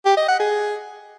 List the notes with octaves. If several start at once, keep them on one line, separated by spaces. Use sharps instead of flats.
G4
D#5
F#5
G#4